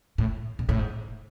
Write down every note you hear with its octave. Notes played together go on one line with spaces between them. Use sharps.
A2
A#2
A2
G#2